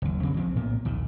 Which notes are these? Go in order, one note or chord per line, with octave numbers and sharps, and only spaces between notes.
F#1 D#2
F2 C#3 C4
A#1 F3 C4
A#1 A2 A#3 B3
A#1 D#2 A#2